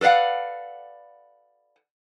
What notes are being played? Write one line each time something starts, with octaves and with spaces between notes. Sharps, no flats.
A4 B4 D5 F5 F#5